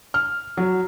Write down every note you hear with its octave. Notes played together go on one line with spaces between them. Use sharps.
F6
F#3